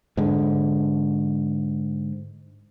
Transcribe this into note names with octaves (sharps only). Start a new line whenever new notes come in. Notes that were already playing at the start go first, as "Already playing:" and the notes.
G#2 D3